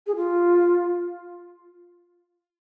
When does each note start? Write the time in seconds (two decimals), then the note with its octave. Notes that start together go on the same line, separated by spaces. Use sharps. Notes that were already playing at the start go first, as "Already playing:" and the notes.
0.07 G#4
0.16 F4